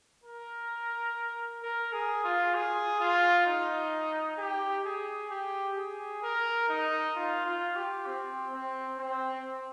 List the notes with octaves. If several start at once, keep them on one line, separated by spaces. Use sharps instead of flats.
A#4
A#4
G#4
F4
G#4
F4
D#4
G4
G#4
G4
G#4
A#4
D#4
F4
F4
G4
C4
C4
C4